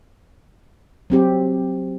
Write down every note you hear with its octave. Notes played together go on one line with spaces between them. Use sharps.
F#3 C4 G4